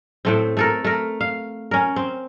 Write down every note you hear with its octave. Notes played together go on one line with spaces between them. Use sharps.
A2 A3 C4
A3 A4 A#4
A3 A#4
F5
C#4 A#4
C4